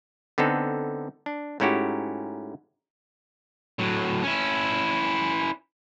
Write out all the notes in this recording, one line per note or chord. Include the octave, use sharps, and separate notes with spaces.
D3 B3 C4 D#4 A4
D4
G#2 A3 C#4 E4 F#4 G4
A2 F#3
C#4 E4